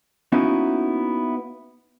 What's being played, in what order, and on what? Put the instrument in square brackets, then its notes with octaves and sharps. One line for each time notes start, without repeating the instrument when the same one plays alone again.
[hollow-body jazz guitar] A#3 B3 C#4 D#4 E4 F#4